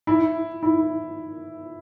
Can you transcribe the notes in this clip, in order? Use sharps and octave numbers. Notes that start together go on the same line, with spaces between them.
E4
E4